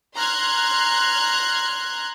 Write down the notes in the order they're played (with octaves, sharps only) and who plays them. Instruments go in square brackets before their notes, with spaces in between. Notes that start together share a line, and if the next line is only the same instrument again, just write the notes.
[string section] A#5 C6 F6 F#6 G#6